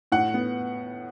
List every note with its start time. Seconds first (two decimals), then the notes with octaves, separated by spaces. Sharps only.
0.12 A2 F#5
0.34 B3